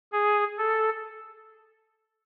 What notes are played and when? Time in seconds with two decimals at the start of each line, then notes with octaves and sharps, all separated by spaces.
0.12 G#4
0.58 A4